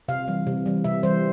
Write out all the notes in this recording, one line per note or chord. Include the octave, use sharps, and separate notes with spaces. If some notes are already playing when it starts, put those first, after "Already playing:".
C3 F5
E3 G3
C3
E3 G3
C3 E5
E3 G3 C5